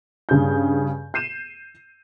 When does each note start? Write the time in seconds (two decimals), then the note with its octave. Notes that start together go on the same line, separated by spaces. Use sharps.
0.29 G2 C#3 G6
1.14 G6 C7 D#7 E7